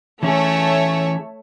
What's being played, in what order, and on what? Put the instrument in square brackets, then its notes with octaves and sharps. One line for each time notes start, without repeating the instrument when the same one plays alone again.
[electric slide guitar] E3 C#4 G#4 [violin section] A3 C#5 E5